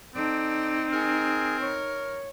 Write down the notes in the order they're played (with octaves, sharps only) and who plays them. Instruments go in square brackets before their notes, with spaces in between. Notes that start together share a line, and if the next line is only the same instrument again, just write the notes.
[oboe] C4 [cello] D#4 [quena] A4 [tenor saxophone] D5
[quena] G#4 [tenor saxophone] A#4
[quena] C#5